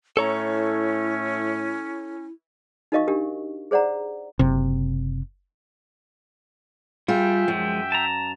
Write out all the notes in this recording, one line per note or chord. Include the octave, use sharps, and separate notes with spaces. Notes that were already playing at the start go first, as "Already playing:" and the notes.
A2 C#4 E4 A4 C#5 A#5
D#4 F#4 A#4 D#5 F5 C#6
D4 G4 A#4
G#4 C5 D5 F#5 A#5
F#1 C3
G3 F4 G#4 E5 G5
F#2 F3 G#3
A5 A#5